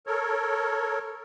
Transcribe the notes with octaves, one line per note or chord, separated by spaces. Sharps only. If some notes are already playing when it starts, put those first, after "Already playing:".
A4 A#4 C#5